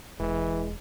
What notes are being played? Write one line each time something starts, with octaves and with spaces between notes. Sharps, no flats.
E1 E3 G#3